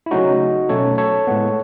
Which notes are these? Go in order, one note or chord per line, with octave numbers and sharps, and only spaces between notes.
E4
C#3 F#3 A3 C#4 D#4 F#4
B2 F#3 A3 C#4 A4 C#5
A4 C#5
A2 G#3 B3